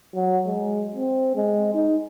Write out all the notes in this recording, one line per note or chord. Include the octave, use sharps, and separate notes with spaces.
F#3
G#3
C4
G#3
D#4